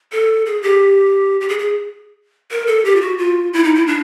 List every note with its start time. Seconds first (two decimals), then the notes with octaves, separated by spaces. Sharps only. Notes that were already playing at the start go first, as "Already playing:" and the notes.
0.12 A4
0.46 G#4
0.63 G4
1.41 G4
1.49 G#4
1.59 G#4
2.51 A#4
2.67 A4
2.85 G4
2.96 F4
3.01 F#4
3.18 F4
3.53 E4
3.64 D#4
3.75 E4
3.87 D4